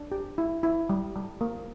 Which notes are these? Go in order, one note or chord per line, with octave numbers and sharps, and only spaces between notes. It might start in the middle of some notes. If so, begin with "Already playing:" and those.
Already playing: D4
G4
E4
E4
G3
G3
A#3